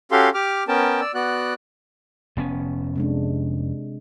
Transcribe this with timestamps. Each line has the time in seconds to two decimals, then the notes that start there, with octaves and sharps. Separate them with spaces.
0.12 C#4 F#4 G4 A4 F5 C6
0.34 G4 D6 F6
0.68 B3 C#4 A#4 G5 A5
1.01 D5 E6
1.14 B3 F#4 D5 F#6
2.37 F1 B3 C#4
2.96 C3 G#3 D4